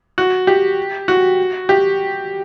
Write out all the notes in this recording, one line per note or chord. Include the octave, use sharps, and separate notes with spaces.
F#4
G4
F#4
G4